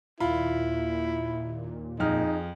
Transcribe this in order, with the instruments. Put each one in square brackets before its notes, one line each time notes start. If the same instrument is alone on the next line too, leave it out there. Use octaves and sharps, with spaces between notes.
[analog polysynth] D#2 A#2 [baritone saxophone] E4 [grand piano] F4 B5
[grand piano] F2 F6 [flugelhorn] D#4 [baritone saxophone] G#4